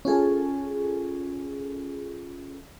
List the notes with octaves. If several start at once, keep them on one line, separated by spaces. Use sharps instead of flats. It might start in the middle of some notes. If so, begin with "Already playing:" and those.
C#4 F4 G#4 A4